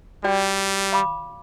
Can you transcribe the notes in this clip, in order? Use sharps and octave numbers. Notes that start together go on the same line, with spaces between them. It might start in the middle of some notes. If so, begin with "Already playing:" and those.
G3 F#4 D5 G5
F5 B5 D6